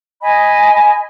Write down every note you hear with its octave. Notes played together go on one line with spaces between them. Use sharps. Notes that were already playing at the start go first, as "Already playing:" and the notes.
D#5 G#5 B5